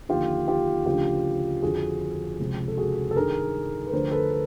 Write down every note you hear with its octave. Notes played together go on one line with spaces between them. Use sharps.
D#2 D3 F3 F4 G4
F4 G4
D2 C#3 F3 F4 G4
F2 D3 F3 F#4 G#4
C#2 C3 F3
A4
F#4 G#4
A4
G2 D#3 G#4 A#4
B4
D2 D3 F3 A#4 C5
A4 B4
B4